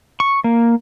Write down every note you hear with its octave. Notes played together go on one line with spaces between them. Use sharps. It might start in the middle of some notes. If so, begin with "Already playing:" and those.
C#6
A#3